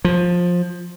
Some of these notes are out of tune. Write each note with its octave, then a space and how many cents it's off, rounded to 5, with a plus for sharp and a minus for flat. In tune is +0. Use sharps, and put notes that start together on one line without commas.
F3 +15